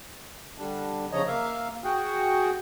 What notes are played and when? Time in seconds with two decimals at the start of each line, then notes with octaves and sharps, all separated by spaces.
0.58 D3 G3 D4
1.12 C#3 F3 C#5 D#5 A#5
1.27 A#3 E5 F5
1.84 F#4 G#4 F#5 G5